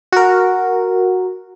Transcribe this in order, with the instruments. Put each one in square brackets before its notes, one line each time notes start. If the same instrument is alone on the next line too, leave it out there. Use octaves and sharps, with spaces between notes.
[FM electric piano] F#4 A#4